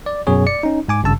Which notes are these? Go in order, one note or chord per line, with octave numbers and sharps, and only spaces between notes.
D5
F#2 B2 G#4 C#5
D5 C#7
C#4 D#4
G#2 G#5 D6
G#1 G2 C#3 A5 E6